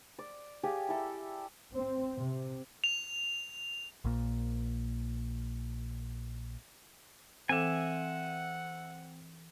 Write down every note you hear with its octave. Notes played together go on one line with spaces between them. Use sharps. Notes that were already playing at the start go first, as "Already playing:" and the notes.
D5
G4 G#4 D5 F5
E4 A4
C4
C3
F7
A#1 A#2
E3 C4 A4 E5 F#5 G#5 D6